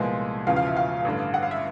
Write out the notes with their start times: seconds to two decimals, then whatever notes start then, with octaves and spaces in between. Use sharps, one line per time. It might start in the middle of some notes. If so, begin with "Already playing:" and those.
Already playing: C2 A#2 F3 G#3 B3
0.46 E1 E2 C#3 F3 F5
0.56 F5
0.67 E5
0.77 F5
1.05 A1 G2 D3
1.34 F#5
1.43 F5
1.51 E5